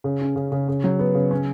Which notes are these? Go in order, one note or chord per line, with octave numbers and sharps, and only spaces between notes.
C#3
C#4
C#3
C#3
C#3
F#3
B3
C#3
C#4